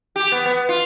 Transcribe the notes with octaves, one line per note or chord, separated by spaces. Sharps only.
G4
B3
B3
F4